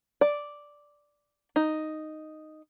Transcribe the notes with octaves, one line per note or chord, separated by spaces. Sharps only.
D5
D#4